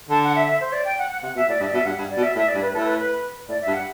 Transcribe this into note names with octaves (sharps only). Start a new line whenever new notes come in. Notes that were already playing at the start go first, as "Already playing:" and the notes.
D3 A5
F#5
E5
E5
C5
D5
G5
F#5
F#5
C3 F#5
B2 E5
A2 D5
G2 E5
D5
B2 E5
G2 F#5
G2
D5
B2
E5
A2 E5
D5
G2
B4
A2 A4
B4
B4
A2 D5
E5
G2
F#5